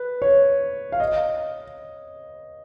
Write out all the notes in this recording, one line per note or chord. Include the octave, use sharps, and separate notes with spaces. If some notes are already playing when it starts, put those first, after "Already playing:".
Already playing: B4
C#5
F5
D#5